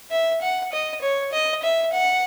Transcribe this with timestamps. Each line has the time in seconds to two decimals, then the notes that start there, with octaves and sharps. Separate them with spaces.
0.11 E5
0.41 F#5
0.72 D#5
1.01 C#5
1.32 D#5
1.63 E5
1.93 F#5